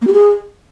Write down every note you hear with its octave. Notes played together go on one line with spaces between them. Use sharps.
A#3
G4
G#4